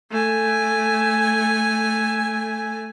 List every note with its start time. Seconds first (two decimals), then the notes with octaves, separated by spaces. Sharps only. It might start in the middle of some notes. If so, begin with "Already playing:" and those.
0.11 A3 G#5